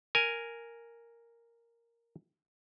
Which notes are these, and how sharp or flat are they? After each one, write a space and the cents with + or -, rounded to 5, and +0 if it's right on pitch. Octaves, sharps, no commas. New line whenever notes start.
A#4 +0 G#5 +0